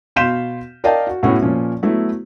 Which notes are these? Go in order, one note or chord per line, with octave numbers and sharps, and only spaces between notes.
B2 F5 C6 G6 B6 E7
A#4 D5 D#5 F5 G5 A5
F#4
A2 B3 C#4 E4 F#4
A#2 F3 C#4
F#3 A3 B3 E4